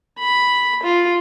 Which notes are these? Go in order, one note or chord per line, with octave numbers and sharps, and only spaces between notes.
B5
F4